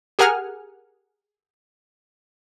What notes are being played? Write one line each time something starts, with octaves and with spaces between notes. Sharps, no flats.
G4 G#4 A#4 F#5 G#5 F6